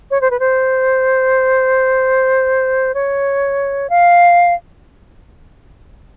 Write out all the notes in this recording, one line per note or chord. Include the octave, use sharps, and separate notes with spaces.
C#5
C5
B4
C5
C#5
F5